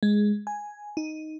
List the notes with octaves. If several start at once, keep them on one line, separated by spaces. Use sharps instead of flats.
G#3
G#5
D#4